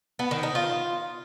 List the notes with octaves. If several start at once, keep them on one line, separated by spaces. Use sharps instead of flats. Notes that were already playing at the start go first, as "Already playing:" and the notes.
B3
D#3
D#4
F4